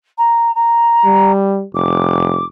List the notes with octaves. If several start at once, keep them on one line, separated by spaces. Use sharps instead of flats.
A#5
A#5
G3
F1 D6